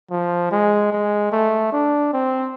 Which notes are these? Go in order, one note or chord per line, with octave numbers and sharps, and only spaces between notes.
F3
G#3
G#3
A3
D4
C4